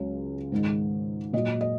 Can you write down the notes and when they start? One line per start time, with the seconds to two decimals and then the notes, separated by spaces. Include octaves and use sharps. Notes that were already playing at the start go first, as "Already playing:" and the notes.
Already playing: C#2 C#3 F#3
0.52 G#2 D#3 G#3
1.33 A#2 F#3 D#5
1.61 D#5